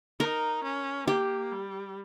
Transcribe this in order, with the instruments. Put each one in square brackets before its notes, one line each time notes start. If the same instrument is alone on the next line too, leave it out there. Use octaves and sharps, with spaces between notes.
[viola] D#4 [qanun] A#4
[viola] C#4
[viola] A#3 [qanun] G4
[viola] G3